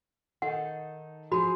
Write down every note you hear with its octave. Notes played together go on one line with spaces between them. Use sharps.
D#3 D#4 A4 F#5
F3 F#4 G#4 B5